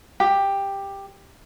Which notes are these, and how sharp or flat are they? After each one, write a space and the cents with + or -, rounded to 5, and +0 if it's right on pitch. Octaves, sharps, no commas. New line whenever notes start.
G4 +10